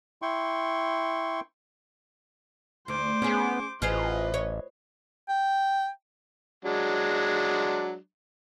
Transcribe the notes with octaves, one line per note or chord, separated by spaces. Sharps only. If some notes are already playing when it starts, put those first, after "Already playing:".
E4 G5 C6 C#6
D2 C5 D6
B3 C#4 G#4
A1 F4 G#4 B4 C5 D#5
C#5
G5
F#3 G#3 D4